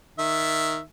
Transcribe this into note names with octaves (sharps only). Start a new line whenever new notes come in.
D#3 E5